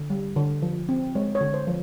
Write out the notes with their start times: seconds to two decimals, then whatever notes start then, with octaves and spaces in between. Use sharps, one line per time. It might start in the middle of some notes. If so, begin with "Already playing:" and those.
Already playing: D3
0.10 G3
0.36 D3
0.62 F3
0.89 C4
1.15 G#3 C#5
1.35 C#5
1.41 D3
1.54 C5
1.67 F3